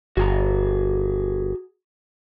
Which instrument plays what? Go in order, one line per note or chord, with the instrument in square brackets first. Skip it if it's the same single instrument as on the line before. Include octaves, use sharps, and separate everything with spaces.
[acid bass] G1 [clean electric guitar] F#4 G#4 A#5